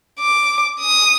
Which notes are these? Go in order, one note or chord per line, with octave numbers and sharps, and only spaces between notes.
D6
D#6